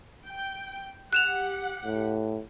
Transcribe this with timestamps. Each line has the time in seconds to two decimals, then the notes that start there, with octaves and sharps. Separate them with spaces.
0.25 G5
1.13 G4 F#5 F#6 E7 F7
1.85 A2